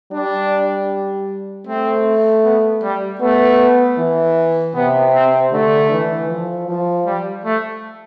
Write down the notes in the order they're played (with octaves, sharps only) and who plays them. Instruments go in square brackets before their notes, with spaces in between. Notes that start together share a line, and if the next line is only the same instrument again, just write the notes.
[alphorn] G3 [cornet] D4
[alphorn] A3 [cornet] C4
[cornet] B3
G3
[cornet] A3 [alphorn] B3
[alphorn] E3
[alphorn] C3 [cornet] B3
[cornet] C4
[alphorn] D3 [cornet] A3
[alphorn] E3
F3
F3
[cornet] G3
A3